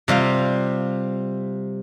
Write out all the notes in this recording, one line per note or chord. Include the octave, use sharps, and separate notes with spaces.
C3 G3 F4 F5